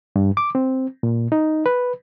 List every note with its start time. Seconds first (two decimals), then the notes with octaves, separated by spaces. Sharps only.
0.16 G2
0.37 D6
0.55 C4
1.03 A#2
1.32 D#4
1.66 B4